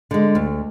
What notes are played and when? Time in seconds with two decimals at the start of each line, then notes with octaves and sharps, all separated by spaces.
0.11 D3 G#3
0.35 D2